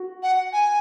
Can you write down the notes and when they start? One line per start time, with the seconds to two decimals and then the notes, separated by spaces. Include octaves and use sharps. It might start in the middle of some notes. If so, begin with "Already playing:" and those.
Already playing: F#4
0.23 F#5
0.53 G#5